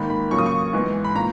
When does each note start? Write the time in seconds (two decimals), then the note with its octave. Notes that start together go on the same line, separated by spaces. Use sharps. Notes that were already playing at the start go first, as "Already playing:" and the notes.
Already playing: G#2 D#3 A#3 B5
0.10 B5
0.31 C#3 F#3 A#3 C#6
0.38 D#6
0.46 C#6
0.73 G#2 E3 G#3 B3
1.05 B5
1.15 A#2 A#5